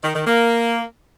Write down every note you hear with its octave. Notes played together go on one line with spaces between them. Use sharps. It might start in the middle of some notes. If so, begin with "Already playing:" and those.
D#3
D#3
A#3